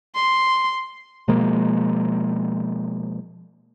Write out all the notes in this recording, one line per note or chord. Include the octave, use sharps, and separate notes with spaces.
C6
B2 F3 G#3 A#3